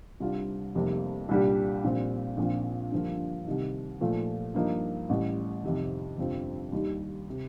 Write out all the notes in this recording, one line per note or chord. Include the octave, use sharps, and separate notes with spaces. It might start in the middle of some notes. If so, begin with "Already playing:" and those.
C2 C3 G3 D4 F4
F1 F2 C3 G3 A#3
C2 A#2 G3 D4 G4
A#1 A#2 G3 C4
A#1 A#2 F3 C4 F4
G2 D3 F3 A#3 F4
C2 C3 D#3
A#2 F3 A3
G2 F3 A#3 D#4
A1 A2 G3
F2 C3 D#3
G1 F2 C3 F3 C4
D#2 D#3 G3
C3